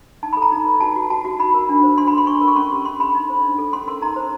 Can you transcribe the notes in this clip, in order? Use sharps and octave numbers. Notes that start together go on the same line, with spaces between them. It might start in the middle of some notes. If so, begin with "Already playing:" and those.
D#4 A5
A4 B5
A#5
D#4
B4
F#4 A5
F#4
F#4 A5
F#4
D#4 B5
A#4
D4
C5
D4 C6
A4 B5
C6
D4 C#6
A#4
C#6
C#4 C6
G4
C#4 C6
A4 B5
D#4
C5
D4
A4
C#4 C6
A#4 C6
D#4 A#5
C5